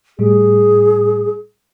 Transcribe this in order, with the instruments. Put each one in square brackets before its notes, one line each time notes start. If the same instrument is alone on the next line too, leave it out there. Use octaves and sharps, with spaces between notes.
[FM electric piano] A2 G3 [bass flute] G#4